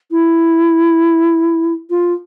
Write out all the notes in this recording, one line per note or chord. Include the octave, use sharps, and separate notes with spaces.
E4
F4